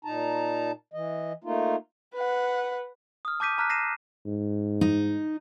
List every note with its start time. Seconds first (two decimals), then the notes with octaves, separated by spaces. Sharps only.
0.05 A#2 D#4 A5 A#5
0.93 E3 D#5
1.44 A3 A#3 D#4 F4
2.15 B4 F#5
3.25 D#6 F6
3.40 A5 D6 G6 B6 D#7
3.58 A5 A#5 F6 F#6 B6
3.70 A#6 C7 D#7 E7
4.26 G#2
4.81 D#4